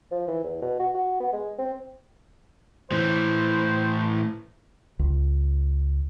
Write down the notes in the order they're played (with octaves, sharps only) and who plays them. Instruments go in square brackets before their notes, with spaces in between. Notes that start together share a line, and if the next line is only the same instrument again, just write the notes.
[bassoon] F3
E3
E2
B2
F#4
F#4
B3
G#3
C4
[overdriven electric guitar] A2 E3 [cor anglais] C5
[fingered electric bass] C#2